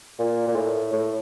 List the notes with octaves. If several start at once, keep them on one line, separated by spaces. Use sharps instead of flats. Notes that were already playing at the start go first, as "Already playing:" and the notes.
A#2
A#2
A2
A2